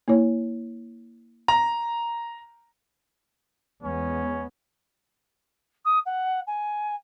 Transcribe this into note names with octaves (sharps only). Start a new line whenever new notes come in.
A#3 E4 C#5
A#5
E2 G#3 B3 C#4
D#6
F#5
G#5